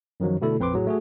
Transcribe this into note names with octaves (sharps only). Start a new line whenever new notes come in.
F#2 D#3 F3 F#3
B2 D3 A3 E4 A4
A#1 F2 C4 B4 C6 D6
A2 F#3 G#4
A3 F#4 G#4